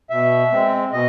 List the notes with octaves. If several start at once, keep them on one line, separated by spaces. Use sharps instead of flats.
B2 E5
G#3 C4
B2 D#5